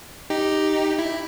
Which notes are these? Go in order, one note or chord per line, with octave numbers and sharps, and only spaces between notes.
D#4 G4
E4